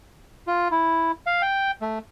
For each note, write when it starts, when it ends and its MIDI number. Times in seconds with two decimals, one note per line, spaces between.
0.47 0.68 65
0.71 1.12 64
1.27 1.42 77
1.42 1.71 79
1.82 1.99 57